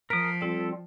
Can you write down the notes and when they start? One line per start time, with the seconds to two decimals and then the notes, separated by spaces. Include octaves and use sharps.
0.10 F3 A#4 D#6 B6 D7
0.42 G3 C4 F4 A4